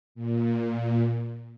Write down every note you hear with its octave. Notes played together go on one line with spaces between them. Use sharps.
A#2